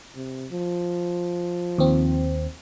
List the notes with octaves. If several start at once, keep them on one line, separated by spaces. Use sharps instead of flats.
C3
F3
D#2 C4